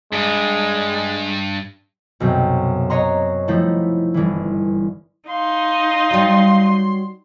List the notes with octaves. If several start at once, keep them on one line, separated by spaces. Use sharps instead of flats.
G2 G#3
B1 F#2 C3
C#5 D#5 F#5 A#5 C6
F3 A3 D#4 E4 A4
G1 E3
D#4 F5 C6
F#3 G3